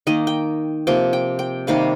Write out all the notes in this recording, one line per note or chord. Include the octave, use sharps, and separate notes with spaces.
D#3 A#3 D#5
G5
C3 F3 A#3 G5
G5
G5
C3 D#3 G3 A#3 F5